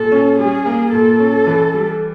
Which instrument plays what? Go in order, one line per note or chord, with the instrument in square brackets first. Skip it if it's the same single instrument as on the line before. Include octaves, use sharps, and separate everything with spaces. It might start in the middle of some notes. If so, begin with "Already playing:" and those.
Already playing: [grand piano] A#2 [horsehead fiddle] A4
[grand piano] C#4
[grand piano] G3 [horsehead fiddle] G#4
[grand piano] A#3
[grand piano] A#2 [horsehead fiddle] A4
[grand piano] C#4
E3
G3